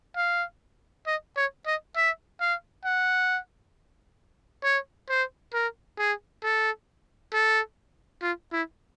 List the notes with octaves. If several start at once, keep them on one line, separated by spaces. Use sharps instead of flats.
F5
D#5
C#5
D#5
E5
F5
F#5
C#5
C5
A#4
G#4
A4
A4
F4
E4